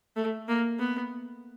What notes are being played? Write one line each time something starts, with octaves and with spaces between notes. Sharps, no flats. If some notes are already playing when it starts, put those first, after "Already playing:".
A3
A#3
B3